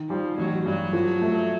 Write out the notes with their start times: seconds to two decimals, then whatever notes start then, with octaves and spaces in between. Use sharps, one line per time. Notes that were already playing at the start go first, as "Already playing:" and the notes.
Already playing: D#3
0.09 F3 G3
0.37 A1 F#3
0.66 G2 F#3
0.93 F3
1.22 A3